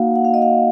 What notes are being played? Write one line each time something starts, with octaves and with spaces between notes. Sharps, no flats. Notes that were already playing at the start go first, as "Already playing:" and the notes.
Already playing: A#3 D#4 F#4 F5 F#5
F#5
F5
D#5
F5